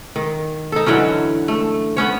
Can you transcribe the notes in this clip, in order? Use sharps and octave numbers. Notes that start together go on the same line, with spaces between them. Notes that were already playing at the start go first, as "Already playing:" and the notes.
D#3
D#4 A4
D3 E3 F#3 C#4
A3
B3 C#4 C#5